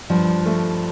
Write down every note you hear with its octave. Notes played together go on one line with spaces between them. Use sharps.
G2 F3
A3